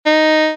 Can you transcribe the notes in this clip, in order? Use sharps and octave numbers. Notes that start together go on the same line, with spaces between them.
D#4